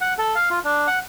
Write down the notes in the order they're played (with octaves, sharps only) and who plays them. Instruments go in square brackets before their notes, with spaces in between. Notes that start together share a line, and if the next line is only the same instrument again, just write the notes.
[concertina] F#5
A4
F5
F4
D4
F#5